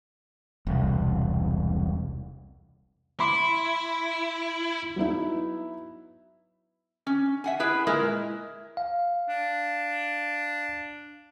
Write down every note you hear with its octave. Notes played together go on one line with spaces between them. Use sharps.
E1 C2
E4 B5 C6 D6
F#3 B3 D#4 E4
C#4
E5 F#5 G#5
E4 G#4 B4 E5
A#2 G#3 E4 A#4 E5
F5
D4